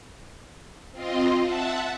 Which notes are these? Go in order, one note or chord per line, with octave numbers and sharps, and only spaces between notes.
C4 F4 C5 D#5
E5 F#5 A5